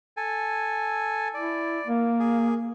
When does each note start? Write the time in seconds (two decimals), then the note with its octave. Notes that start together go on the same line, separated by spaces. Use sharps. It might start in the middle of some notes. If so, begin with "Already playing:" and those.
0.17 A4 G#5
1.34 E4 D5
1.87 A#3
2.20 G#4